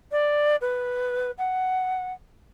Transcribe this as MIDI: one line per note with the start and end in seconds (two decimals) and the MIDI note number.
0.12 0.56 74
0.61 1.31 71
1.38 2.13 78